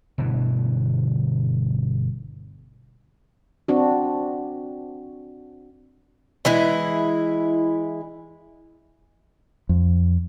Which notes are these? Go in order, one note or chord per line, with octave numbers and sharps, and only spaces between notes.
G1 B2 D3 E3
C4 D4 F#4
E3 G#3 E4
F2